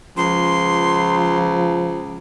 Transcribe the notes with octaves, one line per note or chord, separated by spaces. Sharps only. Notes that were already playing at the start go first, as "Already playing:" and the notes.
C#2 F3 C6